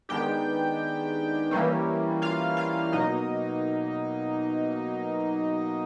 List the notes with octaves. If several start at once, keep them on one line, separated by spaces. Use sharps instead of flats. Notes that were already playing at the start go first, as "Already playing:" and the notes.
D#3 G#3 B3 D4 G4 G5
E3 G3 A#3 C#4
F4 F5
F4 F5
B2 F#3 A#3 D#4 D#5